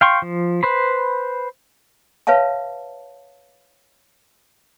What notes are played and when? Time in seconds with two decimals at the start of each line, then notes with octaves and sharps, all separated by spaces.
0.01 F5 G5 C6 C#6
0.22 F3
0.63 B4 C5 B5
2.27 B4 C#5 E5 F5 A5